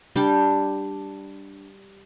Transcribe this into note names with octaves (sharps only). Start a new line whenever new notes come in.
G3 D4 G5 A5